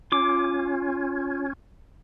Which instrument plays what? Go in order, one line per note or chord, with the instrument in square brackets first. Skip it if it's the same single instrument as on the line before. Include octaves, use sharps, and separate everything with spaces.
[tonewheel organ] C#4 [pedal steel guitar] F4 D6